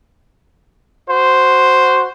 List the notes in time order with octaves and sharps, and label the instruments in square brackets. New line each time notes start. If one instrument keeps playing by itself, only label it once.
[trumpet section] F#4 C5